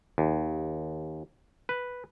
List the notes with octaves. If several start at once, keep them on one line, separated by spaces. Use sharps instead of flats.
D#2
B4